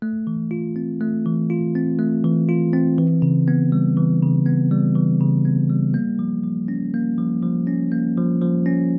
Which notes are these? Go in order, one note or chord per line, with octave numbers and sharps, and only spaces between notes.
A3
E3
F4
C4
A3
E3
F4
C4
A3
E3
F4
C4
E3
C#3
B3
G3
E3
C#3
B3
G3
E3
C#3
B3
G3
A#3
F3
F3
C#4
A#3
F3
F3
C#4
A#3
F3
F3
C#4